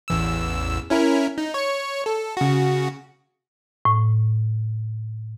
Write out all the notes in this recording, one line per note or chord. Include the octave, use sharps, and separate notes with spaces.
A1 E2 E6
C#4 E4 A#4
D#4
C#5 C#7
A4
C#3 F#4
A2